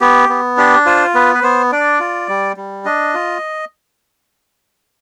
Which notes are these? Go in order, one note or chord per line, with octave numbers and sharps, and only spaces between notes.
B3 G4
B3
D4 G4
F4 C5
B3 B4
B4
B3 C5
D4 D5
F4
G3
G3
D4 D#5
F4